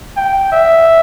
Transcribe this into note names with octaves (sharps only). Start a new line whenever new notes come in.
G5
E5